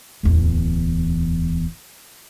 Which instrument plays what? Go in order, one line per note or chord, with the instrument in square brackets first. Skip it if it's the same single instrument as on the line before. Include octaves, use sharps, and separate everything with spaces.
[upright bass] D1 E2